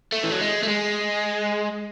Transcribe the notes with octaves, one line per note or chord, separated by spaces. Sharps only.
A3
E3
F#3
G#3
A3
G#3